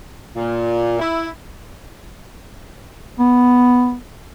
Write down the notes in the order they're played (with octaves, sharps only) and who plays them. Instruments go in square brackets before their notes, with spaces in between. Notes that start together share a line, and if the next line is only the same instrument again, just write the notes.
[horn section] A#2
E4
[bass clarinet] B3